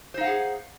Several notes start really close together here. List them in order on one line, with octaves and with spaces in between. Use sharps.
C5 D#4 F5 F#5 G#4